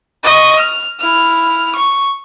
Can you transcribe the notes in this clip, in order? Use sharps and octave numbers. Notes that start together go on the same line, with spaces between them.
D#5 C#6
F6
E4 F6
C#6